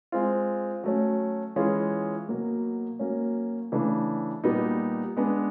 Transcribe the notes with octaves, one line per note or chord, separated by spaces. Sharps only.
G#3 C4 F4
F#3 A3 C#4
E3 G#3 C#4 F4 G#4
B2 F#3 A#3
F#3 A#3 C#4
C#3 E3 A3 D4
A#2 G3 B3 D#4
G#3 B3 D4